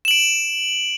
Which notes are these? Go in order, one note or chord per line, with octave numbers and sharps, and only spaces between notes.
D7 E7 F#7